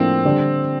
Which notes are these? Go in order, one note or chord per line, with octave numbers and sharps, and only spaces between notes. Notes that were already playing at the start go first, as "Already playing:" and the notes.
Already playing: A2 F3 A#3 C4 D4
D3 G3 D4 G4 D5